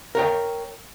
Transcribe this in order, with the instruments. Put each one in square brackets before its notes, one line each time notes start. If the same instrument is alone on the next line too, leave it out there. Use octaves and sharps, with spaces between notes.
[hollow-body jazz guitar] A#4 C#5 G5